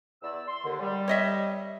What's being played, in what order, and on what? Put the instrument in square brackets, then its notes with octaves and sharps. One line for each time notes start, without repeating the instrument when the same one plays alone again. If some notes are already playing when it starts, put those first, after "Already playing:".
[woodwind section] E2 D5 E6
C6
D#2 D3
G3
[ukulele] C#5 D#5 E5